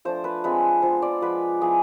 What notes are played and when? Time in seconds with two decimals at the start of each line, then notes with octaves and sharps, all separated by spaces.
0.05 F3 A3 D4 C5
0.24 B4
0.44 G#3 C4 F4 B4
0.82 B3 F4 C5
1.02 D5
1.21 F3 G#3 B3 B4
1.61 F3 B3 E4 G#4